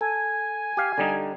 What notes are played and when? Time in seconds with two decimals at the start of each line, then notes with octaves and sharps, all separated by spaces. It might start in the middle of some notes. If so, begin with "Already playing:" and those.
0.01 A4 G#5
0.77 G4 F5
0.98 D3 G3 D#4